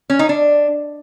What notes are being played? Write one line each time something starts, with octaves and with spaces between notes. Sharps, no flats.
C#4
D#4
D4